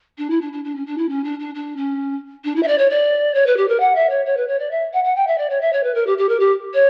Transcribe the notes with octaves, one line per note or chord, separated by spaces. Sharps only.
D4
E4
D4
D4
D4
C#4
D4
E4
C#4
D4
D4
D4
C#4
D4
E4
E5
D5
C#5
D5
C#5
B4
G4
A#4
F#5
E5
C#5
C#5
B4
C#5
D5
E5
F#5
F#5
G5
E5
D5
C#5
E5
C#5
B4
A#4
G4
G4
A#4
G4
C#5